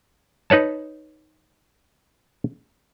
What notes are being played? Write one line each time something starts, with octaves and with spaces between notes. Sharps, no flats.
D#4 B4 C#5 A5